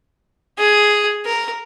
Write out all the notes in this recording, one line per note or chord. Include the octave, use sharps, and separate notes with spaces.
G#4
A#4